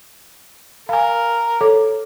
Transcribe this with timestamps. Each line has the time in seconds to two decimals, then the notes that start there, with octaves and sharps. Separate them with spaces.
0.89 A#4 F5 G#5
1.61 A4 C#5 D6